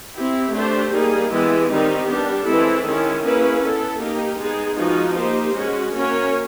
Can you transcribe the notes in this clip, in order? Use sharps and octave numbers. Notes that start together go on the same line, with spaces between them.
C4 E4 G4
A3 D4 G4 C5
G3 A#3 D#4 G#4
E3 G#3 B3 E4 G4
D#3 G3 C4 D#4 G4
G3 B3 D4 G4
E3 G#3 C4 E4 A4
D#3 G#3 C#4 E4
A#3 C#4 E4 G#4 B4
B3 E4 A4
A#3 D#4 G4
G#3 B3 D#4 G#4
F3 G#3 B3 D#4 F#4
A#3 D#4 G4 C5
G#3 C#4 F#4
A#3 C#4 F#4 A#4 C#5